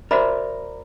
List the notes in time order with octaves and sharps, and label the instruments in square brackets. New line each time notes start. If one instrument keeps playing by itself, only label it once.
[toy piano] F#4 C5 B5 [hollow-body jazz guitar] A#4 D5 E5